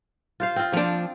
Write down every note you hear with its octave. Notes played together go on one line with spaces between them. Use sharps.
F4 C5 F5
C4 F4
F3 D4